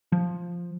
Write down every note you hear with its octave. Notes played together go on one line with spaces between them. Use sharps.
F3